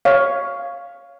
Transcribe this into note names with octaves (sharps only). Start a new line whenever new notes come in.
C#5 F5